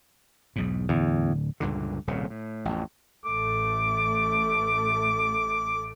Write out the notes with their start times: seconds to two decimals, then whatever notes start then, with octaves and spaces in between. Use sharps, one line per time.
0.56 B1 E2 G#2
0.89 D1 E2 D3
1.60 C#2 G2 A#2 D3
2.07 D#1 C2 A#2 C#3
2.30 A2
2.65 A1 F2
3.25 A1 A3 D6